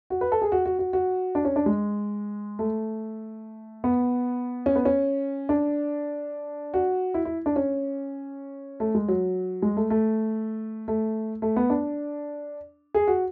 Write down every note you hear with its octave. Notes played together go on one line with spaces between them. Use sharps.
F#4
B4
A4
G#4
F#4
F#4
F#4
F#4
D4
C#4
D4
G#3
A3
B3
C#4
B3
C#4
D4
F#4
E4
E4
D4
C#4
A3
G#3
F#3
G#3
A3
A3
A3
A3
B3
D4
G#4
F#4